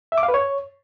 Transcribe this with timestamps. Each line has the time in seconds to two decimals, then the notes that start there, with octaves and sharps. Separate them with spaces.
0.12 E5
0.18 D6
0.23 F5
0.28 B4
0.34 C#5